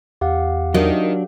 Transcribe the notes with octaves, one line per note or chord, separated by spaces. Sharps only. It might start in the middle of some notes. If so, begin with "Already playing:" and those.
E2 G4 F5 F#5
D#3 F#3 D4